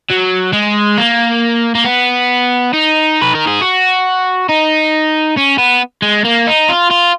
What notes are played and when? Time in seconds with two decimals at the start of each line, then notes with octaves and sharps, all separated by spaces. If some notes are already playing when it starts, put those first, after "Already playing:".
0.10 F#3
0.53 G#3
0.98 A#3
1.75 A#3
1.85 B3
2.73 D#4
3.22 B4
3.35 A#4
3.47 G#4
3.61 F#4
4.49 D#4
5.37 C#4
5.58 B3
6.02 G#3
6.24 A#3
6.47 D#4
6.69 F4
6.90 F4